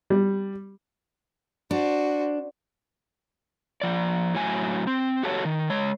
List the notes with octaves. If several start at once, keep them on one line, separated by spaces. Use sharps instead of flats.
G3
D4 F#4 C5
F3 D5
A2 F#3 G#5
C4
F#4 G4 A4 B4 C#5
D#3
G#3 C#5